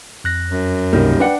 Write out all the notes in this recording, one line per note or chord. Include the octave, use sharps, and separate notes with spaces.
F2 F#6 A#6
F#2
C#2 G2 C3 G3 A#3 D#4
D4 B4 F#5 G5 C#7